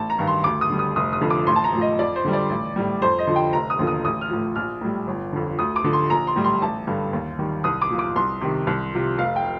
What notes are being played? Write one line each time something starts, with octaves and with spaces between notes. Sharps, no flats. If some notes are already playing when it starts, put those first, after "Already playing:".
Already playing: A1 A5
A#5
G2 D#3
C6
D2 D6
D#6
D3 G3
D#6
F1 D#6
D#6
F2 D3 F3
D6
A1 C6
A5
A#5
A2 F3
D#5
F2 D5
C5
D3 G3
D5
A1
A2 G3
F2 C5
D#5
D3 F3
G5
F1 A#5
D#6
D#2 D3 F3
D#6
A1 D#6
F6
A2 F3
A#1 F6
A2 G3
G1
F2 D3
D2 D#6
D6
D3 F3
C6
A#1 A#5
C6
A2 G3
C6
A1 A5
G2 D3 G3
D#2
D#3 G3
C2 D#6
D6
A#2 F3
D6
C2 C6
C3 D#3
C2
C3 F3
F1 F5
G5